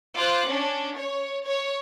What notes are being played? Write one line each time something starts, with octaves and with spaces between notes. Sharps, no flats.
F4 C5 D6 F#6
C#4 D4
C#5
C#5